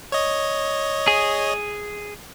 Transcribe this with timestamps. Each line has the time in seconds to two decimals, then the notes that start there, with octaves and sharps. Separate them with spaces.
0.12 C#5 D#5
1.08 G#4